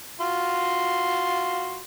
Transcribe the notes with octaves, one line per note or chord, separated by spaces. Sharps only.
F4 F#4 C6